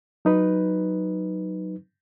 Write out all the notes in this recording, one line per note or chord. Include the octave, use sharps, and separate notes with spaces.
F#3 D#4 B4